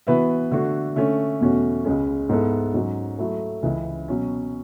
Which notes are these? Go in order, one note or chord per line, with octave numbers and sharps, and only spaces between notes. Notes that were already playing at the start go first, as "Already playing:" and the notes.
E3 B3 F#4 B4 E5
D3 A3 D4 F#4
D3 A3 C#4
E2 B2 A3 C#4 F#4
C#2 C#3 G#3 C#4
G#2 G#3 B3 E4 A4
G#2 F#3 C#4
F#3 A3 E4 A4
C#2 C#3 E3
B2 F#3 C#4